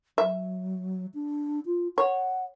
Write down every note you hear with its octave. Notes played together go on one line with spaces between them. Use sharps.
F#3 E5
D4
F4
C#5 F#5